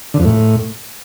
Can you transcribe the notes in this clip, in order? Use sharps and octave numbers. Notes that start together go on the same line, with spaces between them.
D3
F2
A2